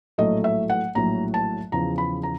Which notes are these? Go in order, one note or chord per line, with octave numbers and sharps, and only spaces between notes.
A#1 A2 F#3 A3 D#5
E5
F#5
A#1 A2 F#3 A3 A#5
A5
E2 C#3 F3 A#5
B5
A#5